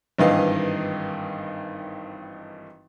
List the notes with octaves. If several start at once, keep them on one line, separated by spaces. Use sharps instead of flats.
G#1 G2 D#3 E3 D#5 F5